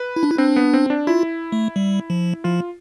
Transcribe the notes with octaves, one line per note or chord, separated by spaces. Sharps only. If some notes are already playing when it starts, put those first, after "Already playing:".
Already playing: B4
E4
D4
E4
C4 D4
B3
C4
D4
E4 F4
A3
G3
F3
F3 F4